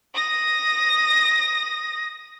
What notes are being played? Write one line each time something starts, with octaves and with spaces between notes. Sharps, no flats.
D#6 A#6